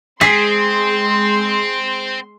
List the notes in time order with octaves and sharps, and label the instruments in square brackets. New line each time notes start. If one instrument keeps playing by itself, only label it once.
[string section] G#3 C6 [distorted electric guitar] C4 [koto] G#4 [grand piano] B6 C7